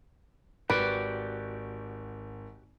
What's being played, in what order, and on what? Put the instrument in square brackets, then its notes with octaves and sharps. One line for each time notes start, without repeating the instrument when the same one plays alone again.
[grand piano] G#1 [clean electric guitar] F#4 G4 D5 [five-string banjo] B4